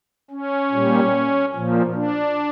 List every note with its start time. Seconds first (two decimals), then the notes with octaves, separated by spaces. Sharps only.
0.30 C#4
0.72 A#2 G3
1.54 A#2 F3
1.94 D4